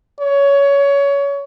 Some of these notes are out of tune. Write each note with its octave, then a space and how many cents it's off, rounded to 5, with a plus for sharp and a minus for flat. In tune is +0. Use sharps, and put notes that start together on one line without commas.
C#5 +20